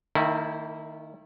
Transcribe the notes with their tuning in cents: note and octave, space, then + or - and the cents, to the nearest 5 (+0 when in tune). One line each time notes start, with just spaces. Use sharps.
D#3 +0 A#3 -45 E4 -20